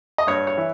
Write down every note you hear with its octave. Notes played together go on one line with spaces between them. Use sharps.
D#5
G2 C#5
C#5
E3